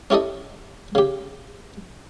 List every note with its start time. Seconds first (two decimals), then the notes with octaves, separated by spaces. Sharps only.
0.10 C#4 E4 G4 A4 D#5
0.95 C#3 G4